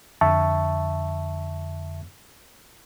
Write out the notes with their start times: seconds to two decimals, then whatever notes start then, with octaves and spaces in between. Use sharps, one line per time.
0.21 F2 D3 E5 A5 C#6